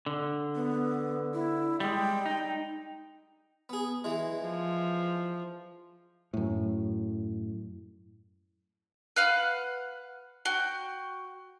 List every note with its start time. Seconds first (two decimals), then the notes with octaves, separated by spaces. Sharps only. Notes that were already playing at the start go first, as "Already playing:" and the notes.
0.06 D3
0.55 B3
1.34 E4
1.80 G3 G#3 G5
2.26 D#4
3.69 B3 G#4
4.04 E3 G#3
4.41 F3
6.34 F#2 A2
9.16 B4 F5 F#5
10.45 F#4 G5